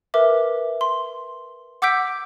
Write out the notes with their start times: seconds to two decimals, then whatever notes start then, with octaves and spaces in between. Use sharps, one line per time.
0.14 A#4 B4 E5 D6
0.81 C6
1.82 F#5 D6 E6 G6 B6 D7